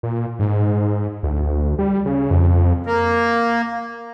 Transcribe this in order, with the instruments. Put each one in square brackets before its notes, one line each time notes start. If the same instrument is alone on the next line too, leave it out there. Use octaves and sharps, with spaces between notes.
[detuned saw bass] A#2
G#2
D2
G3
C#3
F2
[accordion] A#3